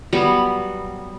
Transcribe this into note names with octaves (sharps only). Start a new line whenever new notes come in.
F#3 G3 B3